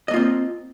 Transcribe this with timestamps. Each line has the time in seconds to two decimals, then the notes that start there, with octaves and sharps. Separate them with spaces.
0.08 D#5
0.11 A#3
0.14 F4
0.16 C4